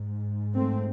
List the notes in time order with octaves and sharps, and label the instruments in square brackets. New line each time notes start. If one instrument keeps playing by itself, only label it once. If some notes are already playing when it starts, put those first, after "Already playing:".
Already playing: [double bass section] G#2
A3 C4